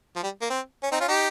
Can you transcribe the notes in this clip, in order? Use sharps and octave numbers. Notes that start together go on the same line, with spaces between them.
F3
G3
A#3
C4
C#4
C4 D#4
C#4 F4
D#4 G4